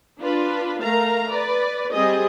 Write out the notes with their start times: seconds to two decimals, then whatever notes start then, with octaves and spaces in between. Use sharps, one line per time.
0.19 D4 F4 B4
0.82 A3 A#4 F5 A#5
1.31 B4 D5
1.92 G3 C4 G#4 D#5